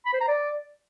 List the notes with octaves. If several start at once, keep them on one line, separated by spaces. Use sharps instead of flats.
B5
C5
A#5
D5